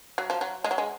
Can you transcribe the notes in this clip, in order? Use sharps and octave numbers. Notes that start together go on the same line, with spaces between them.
F#3
F3
F#3
G#3
F#3
G#3